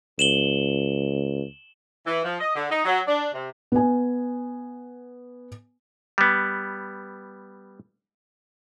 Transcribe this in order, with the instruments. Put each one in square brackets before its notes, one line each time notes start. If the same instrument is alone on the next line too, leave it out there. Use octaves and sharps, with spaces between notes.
[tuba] C#2 [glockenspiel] E7 F#7 G7
[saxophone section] E3
F3
D#5
D3
D#4
F#3
D4
C3
[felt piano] B3 G#5
[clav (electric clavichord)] G3 B3